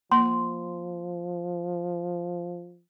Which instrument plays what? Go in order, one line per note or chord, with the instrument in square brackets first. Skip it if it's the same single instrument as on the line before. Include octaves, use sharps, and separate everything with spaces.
[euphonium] F3 [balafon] A#3 [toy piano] C6